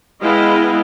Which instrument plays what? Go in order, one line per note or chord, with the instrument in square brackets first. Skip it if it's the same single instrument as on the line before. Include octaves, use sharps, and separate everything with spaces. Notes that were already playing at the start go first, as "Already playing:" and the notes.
[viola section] G#3 B3 E4 D#5 F5 G5